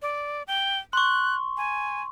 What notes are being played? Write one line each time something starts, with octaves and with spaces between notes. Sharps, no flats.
D5
G5
C6 C#6 F#6
G#5